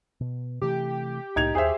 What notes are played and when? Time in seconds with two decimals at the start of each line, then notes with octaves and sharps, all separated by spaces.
0.21 B2
0.62 C3 E3 A3 G4
1.36 C2 A2 A#3 D#4 G#6 F7
1.55 D#2 G#4 C5 E5